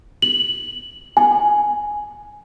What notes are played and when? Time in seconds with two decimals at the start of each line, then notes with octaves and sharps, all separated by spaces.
0.22 F#7
1.17 G#5